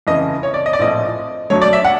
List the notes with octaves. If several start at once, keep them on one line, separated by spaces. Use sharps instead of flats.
F1 F2 C#3 E3 D#5
C#5
D5
D#5
D5
A#1 A2 F3 A3 C4 D#5
F2 D3 F#3 A3 C#5
D5
E5
F#5